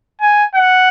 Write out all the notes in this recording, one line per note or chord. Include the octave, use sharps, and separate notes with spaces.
G#5
F#5